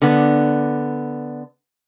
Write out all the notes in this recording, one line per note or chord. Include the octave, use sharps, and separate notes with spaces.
D3 B3